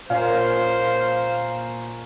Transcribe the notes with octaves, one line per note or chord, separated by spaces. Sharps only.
A#2 A#3 C#4 C5 F5